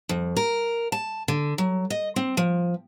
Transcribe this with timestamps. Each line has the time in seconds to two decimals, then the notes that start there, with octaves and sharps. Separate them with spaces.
0.09 F2
0.37 A#4
0.92 A5
1.28 D3
1.58 F#3
1.90 D#5
2.16 C4
2.37 F3